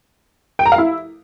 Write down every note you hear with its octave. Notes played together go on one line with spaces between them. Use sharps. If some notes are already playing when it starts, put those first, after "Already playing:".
G5
A#5
F5
E4